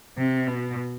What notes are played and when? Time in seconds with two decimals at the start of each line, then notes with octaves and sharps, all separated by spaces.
0.17 C3
0.47 B2